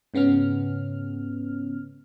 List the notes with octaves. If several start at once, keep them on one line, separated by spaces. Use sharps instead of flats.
G#2 C#3 B3 C#4 F6